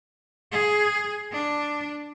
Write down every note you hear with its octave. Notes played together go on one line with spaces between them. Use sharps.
G#4
D4